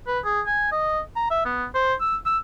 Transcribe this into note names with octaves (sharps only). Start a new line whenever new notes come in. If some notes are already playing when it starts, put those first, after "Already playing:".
B4
G#4
G#5
D#5
A#5
E5
B3
C5
E6
E6